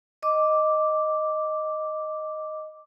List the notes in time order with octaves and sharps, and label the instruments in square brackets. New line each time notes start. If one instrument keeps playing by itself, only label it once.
[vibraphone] D#5 D6